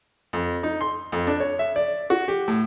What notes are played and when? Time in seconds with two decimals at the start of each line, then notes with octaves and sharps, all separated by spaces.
0.33 F2
0.63 D#4
0.81 C6
1.12 F2
1.27 D4
1.40 C#5
1.59 E5
1.76 D5
2.10 F#4
2.28 G4
2.48 A2